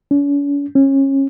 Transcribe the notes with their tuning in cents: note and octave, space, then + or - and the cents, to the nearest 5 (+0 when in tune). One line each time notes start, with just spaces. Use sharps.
C#4 +45
C#4 -25